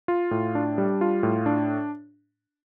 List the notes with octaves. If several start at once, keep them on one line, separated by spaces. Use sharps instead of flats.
F4
A2
D4
G3
F4
A2
D4